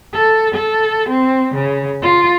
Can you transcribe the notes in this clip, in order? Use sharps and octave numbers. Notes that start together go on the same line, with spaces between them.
A4
A4
C4
C#3
F4